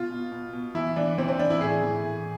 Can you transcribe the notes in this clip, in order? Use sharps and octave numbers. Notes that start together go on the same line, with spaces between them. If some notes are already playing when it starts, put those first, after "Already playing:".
Already playing: B2 F4
B2
B2
B2
E3 E4
E3 D4
E3 C4
C4
E3 D4
E4
A2 G#4
E3
A2